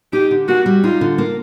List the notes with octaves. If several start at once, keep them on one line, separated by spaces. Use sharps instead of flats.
D#4 G4
D3
A#3 F#4
G3
D#4 F4
D3
A#3